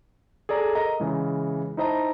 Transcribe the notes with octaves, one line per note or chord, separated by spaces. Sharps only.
G#4 A4 D5 A#5
A#4 D#5 A#5
C#3 E3 G#3
D#4 E4 C5 D#5 A5 A#5